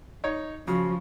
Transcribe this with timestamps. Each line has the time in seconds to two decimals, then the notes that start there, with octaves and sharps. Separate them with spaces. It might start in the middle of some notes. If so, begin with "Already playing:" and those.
0.24 D#4 C#5
0.68 C#3 F3 F#4